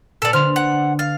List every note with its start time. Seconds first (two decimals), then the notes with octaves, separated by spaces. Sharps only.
0.22 A#2 A4 B4 D5
0.33 D3 D4 C5 C6 F6 F7
0.56 F#5
0.99 F5 A6